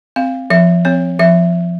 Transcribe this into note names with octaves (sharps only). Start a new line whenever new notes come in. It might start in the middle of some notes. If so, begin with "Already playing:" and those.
C4 F5
F3 E5
C4 C#5
F3 E5